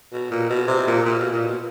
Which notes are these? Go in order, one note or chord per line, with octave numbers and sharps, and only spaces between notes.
B2
A#2
B2
C3
A#2
A#2
B2
A#2
B2